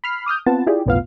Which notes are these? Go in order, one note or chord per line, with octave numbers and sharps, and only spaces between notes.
B5 F6 C7
D6 D#6 F6 G6
B3 C4 F4 B4 F#5 A5
E4 F4 G4 G#4 D5
B1 F2 A2 B3 F4 F5